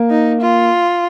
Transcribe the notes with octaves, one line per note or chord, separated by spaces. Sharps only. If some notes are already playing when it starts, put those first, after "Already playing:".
Already playing: A#3
D#4
F4